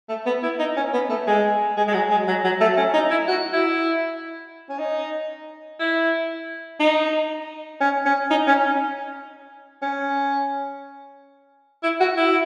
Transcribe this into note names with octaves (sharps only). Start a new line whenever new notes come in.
A3
B3
E4
D#4
C#4
B3
A3
G#3
G#3
G#3
F#3
G#3
F#3
F#3
A3
C#4
D#4
E4
F#4
E4
C#4
D#4
E4
D#4
C#4
C#4
D#4
C#4
C#4
E4
F#4
E4